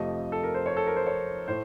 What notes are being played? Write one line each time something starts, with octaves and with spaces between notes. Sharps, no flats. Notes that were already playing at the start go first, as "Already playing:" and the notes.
Already playing: F2 C3 F3 A3 D#5
A4
A#4
C5
C#5
A4
A#4
C5
C#5
A2 A3 C5